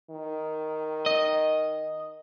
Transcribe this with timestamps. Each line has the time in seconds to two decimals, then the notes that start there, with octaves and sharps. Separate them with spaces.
0.10 D#3
1.06 D#5